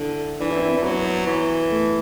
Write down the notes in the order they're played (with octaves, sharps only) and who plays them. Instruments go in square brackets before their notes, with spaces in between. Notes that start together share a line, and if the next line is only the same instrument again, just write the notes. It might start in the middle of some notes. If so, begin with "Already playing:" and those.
Already playing: [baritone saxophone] D3 [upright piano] E4
[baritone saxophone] E3 [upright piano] D4
[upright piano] E4
C4
D4
C4
[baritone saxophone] E3
[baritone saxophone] F#3 [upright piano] B3
[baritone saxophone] E3
[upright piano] A3